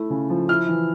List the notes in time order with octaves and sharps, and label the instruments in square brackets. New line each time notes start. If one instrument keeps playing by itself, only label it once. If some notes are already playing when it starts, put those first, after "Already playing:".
Already playing: [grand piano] A3 E4
C#3
F3
E4 F6
E3